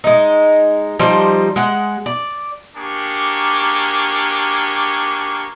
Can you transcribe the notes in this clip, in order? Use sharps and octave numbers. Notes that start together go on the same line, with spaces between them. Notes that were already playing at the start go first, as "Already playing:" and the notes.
G#3 D#4
F3 G3 D#4 C5
G#3 F#5
D5
A#3 D4 G4 G#4 C#6